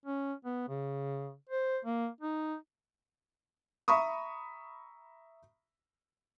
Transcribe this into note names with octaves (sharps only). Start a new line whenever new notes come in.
C#4
B3
C#3
C5
A#3
D#4
E5 A#5 B5 C#6 D#6